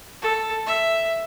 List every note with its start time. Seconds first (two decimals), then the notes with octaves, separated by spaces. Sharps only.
0.22 A4
0.66 E5